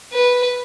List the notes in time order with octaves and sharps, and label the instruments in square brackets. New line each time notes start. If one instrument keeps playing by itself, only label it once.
[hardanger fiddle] B4